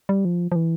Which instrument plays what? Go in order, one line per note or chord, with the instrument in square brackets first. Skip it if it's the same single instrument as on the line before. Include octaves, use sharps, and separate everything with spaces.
[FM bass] G3
F3
F3
E3